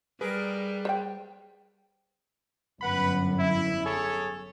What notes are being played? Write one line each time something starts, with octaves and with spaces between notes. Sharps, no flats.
G3 G#4 A#4 B4
C5 D5 G5
G1 F#2 B4 F#5 B5
E4
G#4 A4 C#5